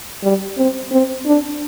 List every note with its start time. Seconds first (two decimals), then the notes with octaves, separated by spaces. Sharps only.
0.23 G3
0.58 C4
0.92 C4
1.26 D4